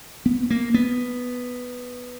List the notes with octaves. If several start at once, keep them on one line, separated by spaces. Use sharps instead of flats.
B3
A#3
B3